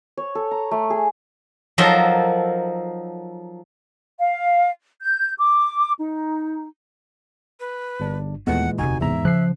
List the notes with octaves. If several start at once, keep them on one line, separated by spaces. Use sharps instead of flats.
C#5
A4
A#5
A3
G#4
F3 F#3 D#4 A4 A#4 C5
F5
G6
D6
D#4
B4
G1 G2 D4
D#2 A#2 E3 G#3 A3 B3 F#5
E1 D2 C3 D#4 F#4 G#5
E2 G#2 E5 A#5
C#3 F3 F#6 C7